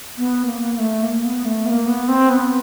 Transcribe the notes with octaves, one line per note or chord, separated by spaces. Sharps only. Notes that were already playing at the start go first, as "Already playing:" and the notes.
B3
A#3
A#3
A3
A#3
B3
A3
B3
A#3
B3
C4
B3